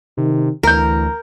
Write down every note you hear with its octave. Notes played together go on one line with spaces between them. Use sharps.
C3 D#3
D2 E3 A#4 A#5 G6